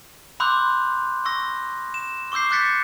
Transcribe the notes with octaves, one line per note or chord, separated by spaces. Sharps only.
B5 C6 D6 E6 F#6 G6
C#6 E6 A#6
E7
C#6 D6 E6 G6 C7
D6 F#6 G6 A6 B6 C#7